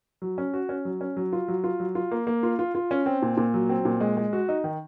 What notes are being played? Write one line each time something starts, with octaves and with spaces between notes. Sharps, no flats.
F#3
C#4
F#4
C#4
F#3
C#4
F#3
F4
F#3
F4
F#3
F4
A#3
A#3
F4
F4
F4
C#4
C4
A#2
A#2
F#3
C4
A#2
G#3
G#3
F#4
D#4
D#3